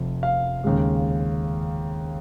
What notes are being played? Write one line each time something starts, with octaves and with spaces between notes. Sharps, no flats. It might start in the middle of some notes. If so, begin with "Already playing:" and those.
Already playing: F1 F2
F5
D#2 C#3 G#3